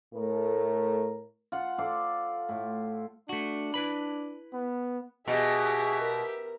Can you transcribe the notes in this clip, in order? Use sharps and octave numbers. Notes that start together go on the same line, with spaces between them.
A2 A3 A#4
F4 F#5
A4 C5 D5 F5
A2
A3 D4 F#4
E4 B4 B5
B3
B2 G4 G#4 E5
A#4